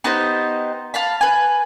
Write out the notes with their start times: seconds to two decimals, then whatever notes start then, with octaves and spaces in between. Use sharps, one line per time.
0.04 B3 D#4 G4 C5
0.94 F5 A5 B5
1.21 B4 G#5